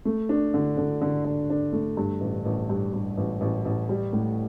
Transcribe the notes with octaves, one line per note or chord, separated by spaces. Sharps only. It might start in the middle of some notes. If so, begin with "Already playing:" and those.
A3
D4
D3
D3
D3
D3
D4
A3
G2
A1
A1
G2
G2
A1
A1
A1
G3
A2